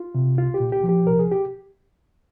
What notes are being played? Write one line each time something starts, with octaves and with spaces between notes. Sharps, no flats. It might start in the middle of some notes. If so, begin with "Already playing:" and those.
Already playing: F4
C3
C2 F4
G4
A#2
G4
F3
G4
C2 A#4
G#4
G4